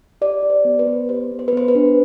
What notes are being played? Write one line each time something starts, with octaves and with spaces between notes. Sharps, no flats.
G4 D5
G4
C5
B3
B4
B3
G4 C5
B3
C5
B4
B3 C5
B4
D4